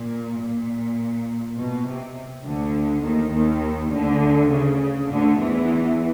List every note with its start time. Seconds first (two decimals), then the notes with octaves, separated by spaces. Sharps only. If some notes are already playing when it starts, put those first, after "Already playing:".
Already playing: A#2
0.40 A#2
1.57 B2
1.86 C3
2.45 D2 D3
3.04 D#2 D#3
3.33 D#2 D#3
3.92 D2 D3
4.51 C#3
5.09 D2 D3
5.39 E2 E3